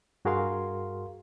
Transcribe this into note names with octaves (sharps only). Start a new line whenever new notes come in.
G2 F#4 G#4 A#4 F5 C6